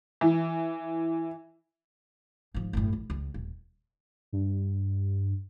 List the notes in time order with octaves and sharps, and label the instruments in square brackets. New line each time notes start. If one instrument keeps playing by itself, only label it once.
[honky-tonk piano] E3
[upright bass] G#2 F3
G1 A2
A1
C#2
D#1
[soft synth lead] G2